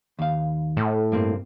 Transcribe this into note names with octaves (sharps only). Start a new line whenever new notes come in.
D#2 F5
A2
G2 A#3 C4